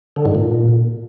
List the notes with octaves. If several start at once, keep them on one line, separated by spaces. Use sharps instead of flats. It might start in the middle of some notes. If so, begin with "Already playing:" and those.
D3
G#2
A#2